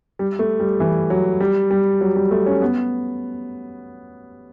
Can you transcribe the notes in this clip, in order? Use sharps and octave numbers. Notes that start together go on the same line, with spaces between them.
G3
A3
G3
E3
F#3
G3
G3
F#3
G3
A3
C#4
B3